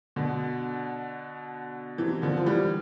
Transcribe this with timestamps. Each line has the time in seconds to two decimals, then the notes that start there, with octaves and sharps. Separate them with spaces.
0.16 B2 D3
1.98 C3 E3
2.22 D3 F3
2.37 F3
2.46 E3 G3